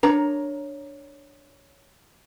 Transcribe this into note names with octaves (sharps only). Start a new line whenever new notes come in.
D4 A#4 C#5 A#5